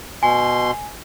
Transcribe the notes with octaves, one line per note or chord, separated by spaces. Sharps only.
B2 G#5 C6